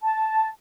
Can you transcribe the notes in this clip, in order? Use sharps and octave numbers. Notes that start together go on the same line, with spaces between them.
A5